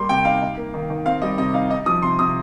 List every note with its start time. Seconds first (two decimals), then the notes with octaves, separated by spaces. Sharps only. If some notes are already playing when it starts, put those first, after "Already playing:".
Already playing: G3 A#3 C6
0.09 C3 G5
0.25 D#4 F5
0.42 D#4
0.57 A#3
0.74 D#3
0.90 D#3
1.06 C4 F5
1.22 G3 D#5
1.38 C3 D#5
1.54 D#4 F5
1.70 D#4 D#5
1.86 F3 D#6
2.02 C3 C6
2.19 C3 D#6